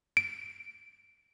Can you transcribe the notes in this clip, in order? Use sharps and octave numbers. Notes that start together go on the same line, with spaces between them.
D7